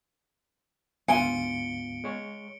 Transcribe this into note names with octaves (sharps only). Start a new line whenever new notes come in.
D2 G#2 B3 F4 G#5 C#7 D7 G7
G#3 C#5